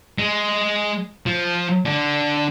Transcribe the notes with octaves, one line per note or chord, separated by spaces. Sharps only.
G#3
F3
D3